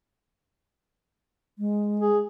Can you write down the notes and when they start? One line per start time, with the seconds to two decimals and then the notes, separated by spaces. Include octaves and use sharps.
1.59 G#3
2.00 G#4